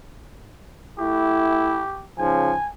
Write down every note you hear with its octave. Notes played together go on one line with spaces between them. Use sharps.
A3 E4 G4
G#2 C#3 F3 G#5